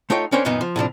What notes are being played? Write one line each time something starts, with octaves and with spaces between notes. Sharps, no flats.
A3 D#4 F4 C#5 G5
C#4 D4 A#4 C5 C#5 G5
F#2 A#2 D#3 A#3 B3 D#4
F3
A2 C3 F3 D4